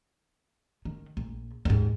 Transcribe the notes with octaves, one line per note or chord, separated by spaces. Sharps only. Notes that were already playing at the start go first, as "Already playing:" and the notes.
D#3
A#1
D#2 G#2